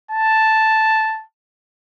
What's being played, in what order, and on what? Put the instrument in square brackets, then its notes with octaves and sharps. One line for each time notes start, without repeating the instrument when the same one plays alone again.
[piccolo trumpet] A5